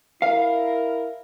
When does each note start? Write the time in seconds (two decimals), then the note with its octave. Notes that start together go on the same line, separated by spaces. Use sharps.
0.22 E4 A#4 F5